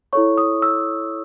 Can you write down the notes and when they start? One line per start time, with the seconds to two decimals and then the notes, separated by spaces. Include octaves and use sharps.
0.13 E4 A4 C#5 C#6
0.38 D#6
0.62 E6